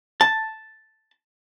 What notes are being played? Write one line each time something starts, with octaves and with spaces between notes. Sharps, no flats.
A5